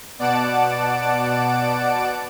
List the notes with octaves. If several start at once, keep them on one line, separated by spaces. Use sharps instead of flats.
B2 D5 F#5 A5 D7